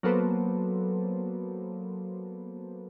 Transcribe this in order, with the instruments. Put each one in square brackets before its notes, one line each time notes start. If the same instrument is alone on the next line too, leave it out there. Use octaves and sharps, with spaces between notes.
[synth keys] F#3 A#3 B3 A4 B4 C5